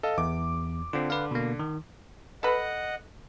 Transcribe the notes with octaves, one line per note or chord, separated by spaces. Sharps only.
A4 D#5 F5
E2 D6
D3 C4 F4
B4 F5
B2 A#3
D#3
A4 B4 D#5 F#5